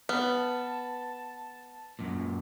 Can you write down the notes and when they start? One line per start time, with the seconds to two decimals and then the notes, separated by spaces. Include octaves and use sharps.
0.09 B3 B4 A5
1.99 F#2 A#2